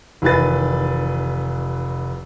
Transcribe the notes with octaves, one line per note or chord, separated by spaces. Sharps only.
F1 D#3 E3 B4 A6